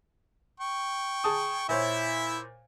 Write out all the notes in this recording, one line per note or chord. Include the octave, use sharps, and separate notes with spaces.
G5 C#6
G#4 A5 D#6
A#2 E4 C5 C#5 E5